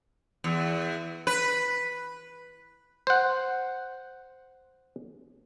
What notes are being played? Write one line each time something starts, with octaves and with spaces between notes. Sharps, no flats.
E2
B4
C5 F#5